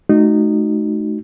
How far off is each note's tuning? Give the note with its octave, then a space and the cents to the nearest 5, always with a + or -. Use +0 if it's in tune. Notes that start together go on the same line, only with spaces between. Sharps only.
A3 -35 D#4 -20 F#4 +0